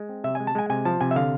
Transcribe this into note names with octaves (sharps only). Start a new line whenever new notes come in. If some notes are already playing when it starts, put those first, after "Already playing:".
Already playing: G#3
C4
C3 E5
G#3 G#5
A5
G#3 G#5
C3 G#5
F3 A5
C3 G#5
E5
D3 F5